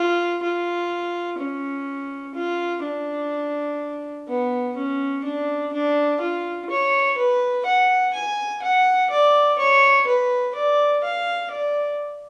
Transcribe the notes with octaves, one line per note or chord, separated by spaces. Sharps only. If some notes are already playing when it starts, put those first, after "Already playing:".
Already playing: F4
F4
C#4
F4
D4
B3
C#4
D4
D4
F4
C#5
B4
F#5
G#5
F#5
D5
C#5
B4
D5
F5
D5